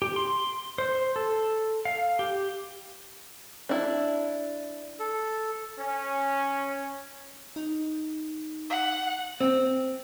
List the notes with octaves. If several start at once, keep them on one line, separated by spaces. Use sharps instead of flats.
G4
C6
C5
A4
F5
G4
D4 E4
A4
C#4
D#4
F#5
C4